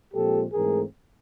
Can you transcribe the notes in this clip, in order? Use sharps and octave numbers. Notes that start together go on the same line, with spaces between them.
A#2 F3 G#3 C4 G4 A4
G#2 E3 A3 C4 G#4 A#4